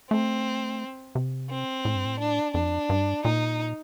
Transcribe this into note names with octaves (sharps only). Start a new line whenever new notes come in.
A3 C4
C3
C4
A2
G2
A2
D4
F2 D4
G2
A#2 D#4